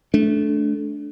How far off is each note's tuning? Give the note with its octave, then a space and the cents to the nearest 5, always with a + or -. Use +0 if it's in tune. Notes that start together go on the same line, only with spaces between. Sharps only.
A3 -20 D4 -15